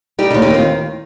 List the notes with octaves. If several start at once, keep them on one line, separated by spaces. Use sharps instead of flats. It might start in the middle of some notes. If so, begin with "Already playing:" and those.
G3 D#4 G4
D#4 G4
D#2
D#4 G4
D#3 C4 F4